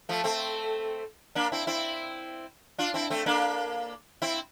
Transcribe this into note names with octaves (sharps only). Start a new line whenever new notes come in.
F3 A3
A3 C4
A#3 D4
C4 E4
C4 E4
D4 F4
C4 E4
A3 C4
A#3 D4
C4 E4